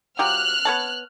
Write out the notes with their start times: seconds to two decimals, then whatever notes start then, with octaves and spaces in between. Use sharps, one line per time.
0.19 F#3 F4 G4 F6 F#6
0.65 B3 C#5 A5